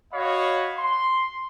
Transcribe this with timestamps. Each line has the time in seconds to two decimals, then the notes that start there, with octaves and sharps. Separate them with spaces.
0.14 F#4 C#5 D#5 F5 B5
0.77 C6